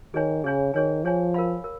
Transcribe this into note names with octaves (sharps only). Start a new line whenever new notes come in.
D#3 G#4 C#5 G#5
C#3 G#4 C#5 G#5
D#3 G#4 C#5 G#5
F3 G#4 C#5 G#5
A#4 F5 B5
A#4